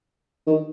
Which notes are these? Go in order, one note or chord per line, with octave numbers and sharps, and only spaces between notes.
D#3